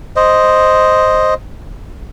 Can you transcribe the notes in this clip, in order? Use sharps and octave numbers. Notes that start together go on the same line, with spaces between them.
C5 D#5